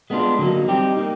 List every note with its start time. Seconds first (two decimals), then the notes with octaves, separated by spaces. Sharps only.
0.10 G#3 B3 D4 F4
0.39 D3 F#3 A#3 D#4
0.68 G3 C4 D#4 G4
0.97 A#3 D#4